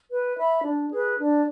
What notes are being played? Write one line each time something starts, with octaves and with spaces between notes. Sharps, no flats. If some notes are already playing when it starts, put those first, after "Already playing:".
B4
E5 B5
D4
G#4 B4
D4